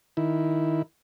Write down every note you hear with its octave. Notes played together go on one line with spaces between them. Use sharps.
D#3 E4